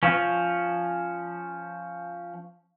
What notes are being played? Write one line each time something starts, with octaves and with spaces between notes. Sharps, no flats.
F3 C#4